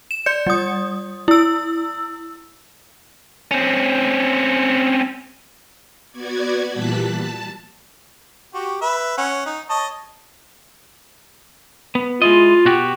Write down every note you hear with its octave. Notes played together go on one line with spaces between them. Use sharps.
E7
D5 G6 C#7
G3 D#6
E4 E6
C4 C#4
B3 F#4 D5 G#6
A#2 E3 G3 A5 F#6 B6
A5
F#4 G4
B4 E5
C#4 F#5
D#4
C#5 D#5 A5
B3
G#3 E4 F4 D#5
B2 F#4 G4